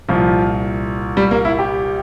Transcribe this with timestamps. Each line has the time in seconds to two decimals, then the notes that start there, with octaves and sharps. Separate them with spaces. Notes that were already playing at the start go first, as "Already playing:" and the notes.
0.08 C2 A#2 F3
1.17 G3
1.31 A#3
1.45 E4
1.59 G4